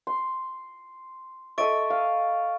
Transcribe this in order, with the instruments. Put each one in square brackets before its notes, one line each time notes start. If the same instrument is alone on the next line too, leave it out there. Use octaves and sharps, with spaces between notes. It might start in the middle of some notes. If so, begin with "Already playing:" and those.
[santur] C6
[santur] A4 D#5 E5 [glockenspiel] C#6 A6 D7
[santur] F5